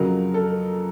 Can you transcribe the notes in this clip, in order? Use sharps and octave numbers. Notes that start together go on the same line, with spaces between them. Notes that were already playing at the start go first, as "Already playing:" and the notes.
Already playing: F2 C#3 F#3 A#4
A4